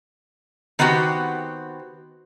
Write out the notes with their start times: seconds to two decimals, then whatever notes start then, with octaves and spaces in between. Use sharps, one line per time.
0.79 D#3 B3 C4 F#4 G4